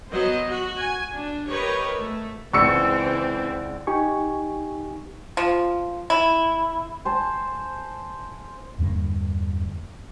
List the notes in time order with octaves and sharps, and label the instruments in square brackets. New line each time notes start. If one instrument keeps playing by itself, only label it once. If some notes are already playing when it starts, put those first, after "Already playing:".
[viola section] F#3 B3 C5 D#5
F#4
G#5
D4
G4 A#4 B4 C#5 D#5
A3
[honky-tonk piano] C#2 [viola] E3 C4 [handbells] D5 F#5 [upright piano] C#6 E6 C#7
[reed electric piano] D#4 G4 G#5 C#6
[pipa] F3
E4
[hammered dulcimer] C5 G#5 A5
[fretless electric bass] E2 G2 D3 A#3